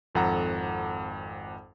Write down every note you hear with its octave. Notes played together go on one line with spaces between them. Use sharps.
G#1 F2 A4 F#5 A#5